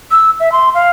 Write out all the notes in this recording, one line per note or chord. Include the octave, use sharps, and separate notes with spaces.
E6
E5
C6
F5